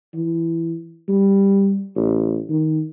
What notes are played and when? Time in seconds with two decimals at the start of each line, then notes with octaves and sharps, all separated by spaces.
0.15 E3
1.08 G3
1.96 A1
2.49 D#3